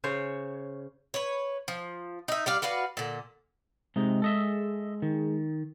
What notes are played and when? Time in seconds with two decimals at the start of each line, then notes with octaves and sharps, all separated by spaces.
0.04 C#3 C5 C#5
1.14 B4 C#5
1.68 F3
2.28 D#4 E5
2.46 G3 D5 F5
2.62 F#4 B4 D5 F5
2.97 A#2 D3
3.96 C3 G#3 D#4
4.22 A4 D#5 E5
5.02 D#3